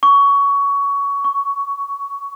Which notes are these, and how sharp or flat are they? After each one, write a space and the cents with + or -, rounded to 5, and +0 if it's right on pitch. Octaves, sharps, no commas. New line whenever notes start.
C#6 +20
C#6 +5